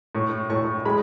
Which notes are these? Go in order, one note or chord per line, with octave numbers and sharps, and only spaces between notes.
A2 C#6
A2 C#6
G#3 B5